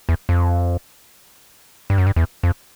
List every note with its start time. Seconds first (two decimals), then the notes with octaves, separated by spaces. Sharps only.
0.09 E2
0.29 F2
1.90 G2
1.98 F#2
2.07 G2
2.16 E2
2.43 F2